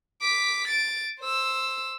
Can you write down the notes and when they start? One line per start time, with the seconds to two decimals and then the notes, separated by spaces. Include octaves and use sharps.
0.22 D6 B6
0.68 A6 D7
1.20 C5 E6